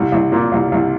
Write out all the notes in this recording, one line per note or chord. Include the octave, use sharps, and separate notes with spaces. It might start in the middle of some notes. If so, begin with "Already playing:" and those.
Already playing: C2
C2
A#2
C2
C2